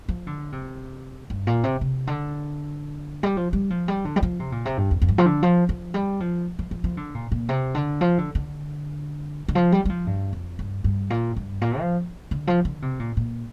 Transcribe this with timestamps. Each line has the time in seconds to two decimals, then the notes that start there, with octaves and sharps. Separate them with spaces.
0.09 F3
0.27 D3
0.52 C3
1.30 G2
1.47 A#2
1.64 C3
1.81 C3
2.07 D3
3.23 G3
3.37 F3
3.53 G3
3.70 F3
3.88 G3
4.05 D3
4.16 G3
4.23 F3
4.40 C3
4.52 A#2
4.65 C3
4.78 G2
4.91 F2
5.02 F2
5.08 G2
5.18 F3
5.26 D3
5.43 F3
5.69 F3
5.94 G3
6.20 F3
6.59 F3
6.71 F3
6.84 F3
6.97 D3
7.14 A#2
7.32 A#2
7.49 C3
7.75 D3
8.01 F3
8.18 D3
8.35 D3
9.48 D3
9.55 F3
9.72 G3
9.85 G3
9.89 F3
10.07 G2
10.33 F2
10.59 G2
10.84 G2
11.10 A#2
11.36 G2
11.61 A#2
11.79 F3
12.31 D3
12.47 F3
12.65 D3
12.82 C3
12.99 A#2
13.17 A#2